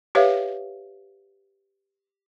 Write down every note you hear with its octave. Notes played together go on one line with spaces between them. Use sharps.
G4 B4 C#5 E5 F5